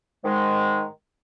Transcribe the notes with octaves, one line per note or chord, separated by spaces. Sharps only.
G#2 D#3 G#3